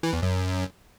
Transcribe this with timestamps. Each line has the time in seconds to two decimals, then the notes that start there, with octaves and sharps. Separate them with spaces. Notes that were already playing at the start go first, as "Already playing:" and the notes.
0.03 E3
0.13 E2
0.23 F#2